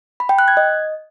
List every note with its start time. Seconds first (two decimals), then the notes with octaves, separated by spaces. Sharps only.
0.20 B5
0.29 G5
0.39 F#6
0.48 G#6
0.57 D#5